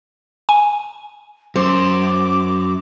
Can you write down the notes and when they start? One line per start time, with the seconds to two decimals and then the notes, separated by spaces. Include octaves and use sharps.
0.49 G#5
1.56 F#2 C5 D6